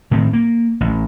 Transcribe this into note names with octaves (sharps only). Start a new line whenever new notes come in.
A2 D#3 C4
A#3
A1